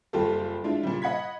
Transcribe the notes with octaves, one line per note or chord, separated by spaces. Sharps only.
F#1 G3 F4 G4 A4
G#3 D4 E4 F4
A#2 C#3 G3
D#5 F#5 B5 G#6 B6